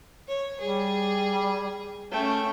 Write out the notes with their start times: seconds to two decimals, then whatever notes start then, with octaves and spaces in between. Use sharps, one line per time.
0.28 C#5
0.60 G3 G#4
2.12 A3 C#4 G5